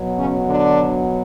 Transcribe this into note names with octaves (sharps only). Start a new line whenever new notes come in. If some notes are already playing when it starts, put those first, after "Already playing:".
Already playing: B2 F#3
C#3 C#4
D3 D4